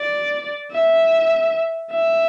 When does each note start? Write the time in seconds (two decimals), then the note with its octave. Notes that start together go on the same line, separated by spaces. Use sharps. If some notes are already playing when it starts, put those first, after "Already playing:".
Already playing: D5
0.72 E5
1.92 E5